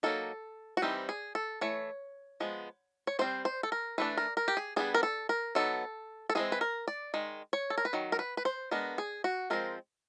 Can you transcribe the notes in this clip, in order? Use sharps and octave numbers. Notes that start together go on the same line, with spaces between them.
F#3 A#3 D#4 A4
F#4
E3 G3 C4 D#4 G4
G#4
A4
E3 A3 C#5
F3 G#3 B3
C#5
G3 C4 D#4 C5
C5
A4
A#4
E3 A3 D4 B4
A#4
A#4
G4
G#4
G3 B3 D4 G#4
A#4
A4
A#4
F#3 B3 D#4 A4
A4
E3 G#3 C4 G#4
B4
A#4
D5
D#3 G#3
C#5
A4
A#4
B4
D#3 F#3
A#4
B4
B4
C5
G#3 B3 D4 A#4
G#4
F#4
F3 G#3 C4 A#4